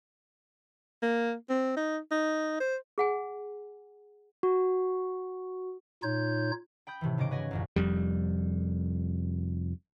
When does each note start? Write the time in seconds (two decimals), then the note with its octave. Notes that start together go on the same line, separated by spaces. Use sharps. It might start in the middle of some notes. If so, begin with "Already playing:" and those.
1.02 A#3
1.50 C4
1.76 D#4
2.11 D#4
2.60 C5
2.98 G#4 F#5 G#5
4.43 F#4
6.03 A#2 D#4 F4 C#5 G6
6.87 G5 B5 D#6 G6
7.01 A2 C3 D#3 E3
7.18 F1 G#2 C#3 D#5 D6 D7
7.31 B4 C#5 D#5 F#5 G#5 A#6
7.51 A1 F#2 A#2
7.76 F1 F2 G3